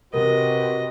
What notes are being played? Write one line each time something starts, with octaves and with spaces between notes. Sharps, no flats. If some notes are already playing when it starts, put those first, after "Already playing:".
C3 F#4 A#4 B4 D#5